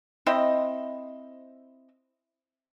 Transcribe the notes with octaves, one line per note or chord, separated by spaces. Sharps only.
C4 E4 D#5